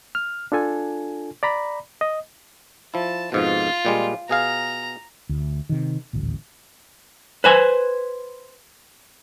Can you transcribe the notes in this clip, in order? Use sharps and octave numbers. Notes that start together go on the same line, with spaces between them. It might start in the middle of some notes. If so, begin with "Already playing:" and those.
F6
D4 F4 A4 G#5
D5 A#5 B5
D#5
F3 E4 A5
F2 G#2 B2 F4
A#2 G3 G#3
B2 G#4 F5 A#5
D2
C3 D#3
D#1 A1 D2
B4 C5 G#5